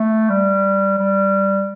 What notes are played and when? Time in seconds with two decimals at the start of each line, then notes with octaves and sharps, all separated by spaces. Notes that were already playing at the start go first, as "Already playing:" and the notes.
Already playing: A3
0.29 G3
0.98 G3